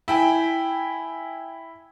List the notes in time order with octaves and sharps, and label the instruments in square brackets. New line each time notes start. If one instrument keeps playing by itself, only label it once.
[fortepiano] E4 G5 G#5